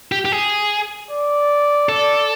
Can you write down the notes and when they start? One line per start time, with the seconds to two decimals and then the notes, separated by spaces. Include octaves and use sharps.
0.12 G4
0.25 G4
0.32 G#4
1.11 D5
1.89 A4 D5